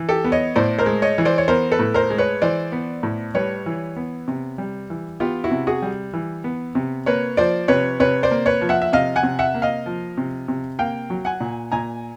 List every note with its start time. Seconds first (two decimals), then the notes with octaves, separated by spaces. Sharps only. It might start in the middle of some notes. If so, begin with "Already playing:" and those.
Already playing: E3
0.09 G4 A4
0.24 B3
0.32 C#5 D#5
0.56 A2 C5 D5
0.78 A#4 C5
0.86 G#3
1.02 C#5 D#5
1.18 E3
1.25 C5 D5
1.38 C#5
1.48 B3 A#4 C5
1.72 A4 B4
1.79 A2
1.94 A#4 C5
2.10 G#3
2.18 B4 C#5
2.42 E3 C5 D5
2.72 B3
3.03 A2
3.34 G3 B4 C#5
3.66 E3
3.96 B3
4.28 C3
4.58 G3
4.90 E3
5.20 B3 F4 G4
5.44 E4 F#4
5.51 C3
5.67 F#4 G#4
5.82 G3
6.13 E3
6.44 B3
6.75 C3
7.06 A#3 B4 C#5
7.37 F3 C5 D5
7.68 C3 B4 C#5
8.00 C3 B4 C#5
8.23 C5 D5
8.31 A#3
8.46 B4 C#5
8.61 F3
8.69 E5 F#5
8.82 E5
8.93 C3 D#5 F5
9.16 F#5 G#5
9.23 C3
9.39 E5 F#5
9.54 A#3
9.62 D#5 F5
9.86 F3
10.18 C3
10.48 C3
10.79 A#3 F5 G5
11.10 F#3
11.25 F#5 G#5
11.40 A#2
11.72 A#2 G#5 A#5